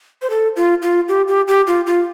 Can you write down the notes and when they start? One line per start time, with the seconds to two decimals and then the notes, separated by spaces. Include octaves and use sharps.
0.22 C5
0.30 A4
0.56 F4
0.82 F4
1.08 G4
1.28 G4
1.48 G4
1.67 F4
1.86 F4